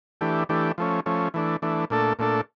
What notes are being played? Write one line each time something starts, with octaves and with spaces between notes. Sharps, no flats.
E3 A3 D4 G4
E3 A3 D4 G4
F3 A3 C#4
F3 A3 C#4
E3 A3 D4
E3 A3 D4
A#2 A3 D4 A4
A#2 A3 D4 A4